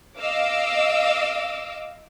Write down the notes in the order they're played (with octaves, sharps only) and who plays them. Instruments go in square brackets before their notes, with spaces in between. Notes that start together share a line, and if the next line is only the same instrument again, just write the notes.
[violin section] D#5 F5 D6 E6